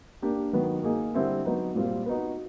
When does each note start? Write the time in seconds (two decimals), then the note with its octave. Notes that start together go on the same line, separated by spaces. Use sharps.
0.22 A#3 D4 G4
0.53 D#3 F#3 B3
0.83 A#3 D#4 G#4
1.14 D3 G3 C4 E4
1.45 F#3 B3 D#4
1.75 A#2 G3 C4 F4
2.06 B3 D#4 F#4